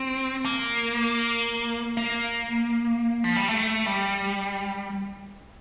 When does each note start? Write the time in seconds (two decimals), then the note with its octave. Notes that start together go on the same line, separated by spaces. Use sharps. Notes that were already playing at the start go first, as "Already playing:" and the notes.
Already playing: C4
0.45 A#3
1.97 A#3
3.24 F3
3.36 G3
3.48 A3
3.86 G3